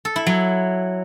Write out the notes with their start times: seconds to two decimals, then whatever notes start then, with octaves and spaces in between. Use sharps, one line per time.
0.05 A4
0.16 E4
0.27 F#3